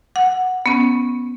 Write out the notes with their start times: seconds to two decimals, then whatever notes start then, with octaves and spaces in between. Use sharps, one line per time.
0.16 F#5
0.66 B3 C#4